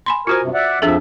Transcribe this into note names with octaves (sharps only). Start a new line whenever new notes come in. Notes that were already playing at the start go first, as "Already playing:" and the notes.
G#5 B5 C6
F4 F#4 A#4 C5 G#5
G2 C3
D5 E5 F#5
F2 F3 D4 G#4 A4 E5